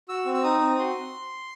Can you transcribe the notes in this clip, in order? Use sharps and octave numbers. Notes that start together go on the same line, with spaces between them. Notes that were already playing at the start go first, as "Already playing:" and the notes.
F#4 E6
C4
E6
D#4 D#6
C4
F#4 C6